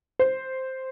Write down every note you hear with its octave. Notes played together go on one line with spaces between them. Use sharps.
C5